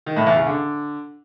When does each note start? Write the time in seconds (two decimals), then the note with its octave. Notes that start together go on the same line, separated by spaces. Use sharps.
0.06 D#3
0.16 A2
0.26 E2
0.36 C#3
0.47 D3